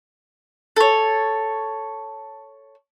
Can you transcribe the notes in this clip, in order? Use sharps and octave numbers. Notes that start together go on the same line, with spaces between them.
A4 C#5